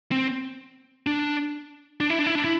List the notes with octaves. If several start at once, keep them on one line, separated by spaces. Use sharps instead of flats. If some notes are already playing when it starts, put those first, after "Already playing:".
C4
D4
D4
E4
D4
E4
D4
E4